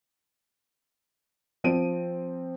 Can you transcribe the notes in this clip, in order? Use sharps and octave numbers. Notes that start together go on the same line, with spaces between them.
F3 C4 D7 D#7